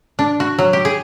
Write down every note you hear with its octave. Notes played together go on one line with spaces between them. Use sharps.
D4
F#4
F#3
G4
G#4